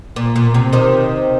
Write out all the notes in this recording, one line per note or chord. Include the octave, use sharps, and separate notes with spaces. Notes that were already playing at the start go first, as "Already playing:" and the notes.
A#2
A#2
C3
C3 D#3